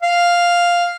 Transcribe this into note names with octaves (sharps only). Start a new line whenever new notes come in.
F5